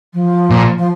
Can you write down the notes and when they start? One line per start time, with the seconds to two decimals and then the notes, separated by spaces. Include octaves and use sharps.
0.13 F3
0.50 A#2
0.77 F3